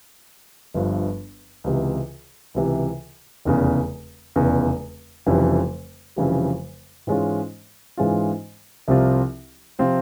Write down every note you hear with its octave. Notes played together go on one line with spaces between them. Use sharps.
G1 G2 F3
C#2 C3 E3
C#2 C3 E3
F1 E2 C#3
F1 E2 C#3
F1 F2 C#3 E3 G3
F1 F2 C#3 E3 G3
G#2 E3 G#3 C#4 F4
G#2 E3 G#3 C#4 F4
C2 C3 F3 C4 F4
C3 F3 C4 F4